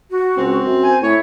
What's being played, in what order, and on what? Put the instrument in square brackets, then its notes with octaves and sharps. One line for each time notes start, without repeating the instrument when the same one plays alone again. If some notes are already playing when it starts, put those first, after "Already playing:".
[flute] F#4
[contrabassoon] C#2 [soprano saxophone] C4
[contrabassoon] F#2
[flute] C5 [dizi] G#5
[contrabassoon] A2 [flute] E4 [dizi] C#5